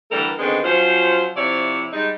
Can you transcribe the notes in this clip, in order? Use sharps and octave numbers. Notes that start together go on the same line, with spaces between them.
D3 E3 G3 A4 A#4
D3 D#3 G#3 B3 C4
F3 F#3 C#4 F4 C5
C3 F3 E4 C#5 D5
G3 G#3 D#4